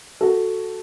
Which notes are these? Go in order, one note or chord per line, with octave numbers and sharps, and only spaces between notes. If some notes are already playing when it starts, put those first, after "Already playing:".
F#4 A4